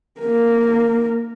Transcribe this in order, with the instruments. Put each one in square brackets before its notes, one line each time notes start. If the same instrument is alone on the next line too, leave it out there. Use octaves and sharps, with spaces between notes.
[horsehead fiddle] A#3 A#4